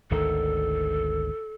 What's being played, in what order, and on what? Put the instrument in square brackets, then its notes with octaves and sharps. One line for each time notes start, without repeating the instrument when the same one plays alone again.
[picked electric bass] G#1 D2 D#3 [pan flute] A4